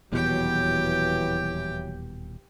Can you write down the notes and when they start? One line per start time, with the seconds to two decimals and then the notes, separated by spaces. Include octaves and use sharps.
0.12 D#1 E2 B2 E3 F#3 G4 G5